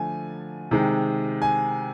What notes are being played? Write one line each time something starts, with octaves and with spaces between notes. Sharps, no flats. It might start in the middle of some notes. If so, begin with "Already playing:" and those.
Already playing: D3 F3 A3 G#5
C3 D#3 G#3
G#5